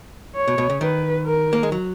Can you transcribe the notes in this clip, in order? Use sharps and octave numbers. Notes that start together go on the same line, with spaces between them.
C#5
B2
B2
C#3
D#3 B4
A#4
A#3
G#3
F#3